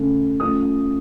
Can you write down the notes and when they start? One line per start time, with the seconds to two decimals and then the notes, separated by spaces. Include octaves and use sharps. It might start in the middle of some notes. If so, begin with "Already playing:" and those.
Already playing: C#3 A3 C#4
0.40 F3 A3 C#4 D#6